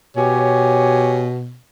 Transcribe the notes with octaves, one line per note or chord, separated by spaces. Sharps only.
B2 G4 C#5 G#5